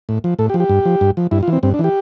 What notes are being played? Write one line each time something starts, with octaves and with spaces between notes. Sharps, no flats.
A2
F3
A2 A4
G4
F3
G4
G2
F3
G2
F3
G2 E4
F4
E3
C4
G2 C4
D4
E3
G4